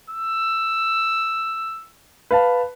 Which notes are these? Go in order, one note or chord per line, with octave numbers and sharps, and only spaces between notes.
E6
B4 F5 A5